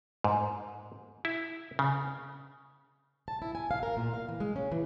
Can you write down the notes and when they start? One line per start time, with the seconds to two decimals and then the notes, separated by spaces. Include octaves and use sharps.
0.24 G#2
1.25 E4
1.79 C#3
3.28 A5
3.42 E4
3.55 G#5
3.71 F5
3.83 A#4
3.97 A#2
4.14 F5
4.28 E3
4.40 G#3
4.56 C#4
4.72 E3